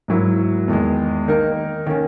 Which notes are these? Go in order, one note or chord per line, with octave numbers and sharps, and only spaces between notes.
G#2 F#3 A#3 E4
E2 D#3 G#3
D#3 A#3 D#4 A#4
D#3 A#3 C#4